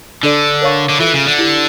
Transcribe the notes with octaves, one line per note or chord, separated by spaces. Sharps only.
D3 D4 A4 D5
A#4 C#5 F5 C#6
D3
E3 F4 A4 E5
C#3
D3
E4 G4 D5 A5